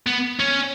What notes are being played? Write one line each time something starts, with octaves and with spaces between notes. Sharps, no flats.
B3
C#4